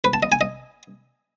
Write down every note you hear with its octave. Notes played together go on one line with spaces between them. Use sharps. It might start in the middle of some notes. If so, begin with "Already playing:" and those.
B4
A5
D#5
G#5
D#5